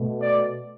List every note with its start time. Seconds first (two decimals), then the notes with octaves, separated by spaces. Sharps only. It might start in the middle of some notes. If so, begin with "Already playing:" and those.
Already playing: B2 A3
0.22 D5